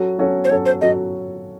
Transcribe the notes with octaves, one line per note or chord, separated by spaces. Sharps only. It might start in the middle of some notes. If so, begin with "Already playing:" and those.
Already playing: F#3 C#4 F#4 A4
F#3 C#4 F#4 A4
C5
F#3 C#4 F#4 A4 C#5
C5
F#3 C#4 F#4 A4 D#5